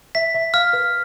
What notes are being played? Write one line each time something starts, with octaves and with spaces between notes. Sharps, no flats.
E5 B6
E5
F5 F6
B4